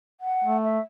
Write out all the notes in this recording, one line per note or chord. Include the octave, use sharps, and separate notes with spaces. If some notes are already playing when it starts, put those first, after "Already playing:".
F#5
A3
E5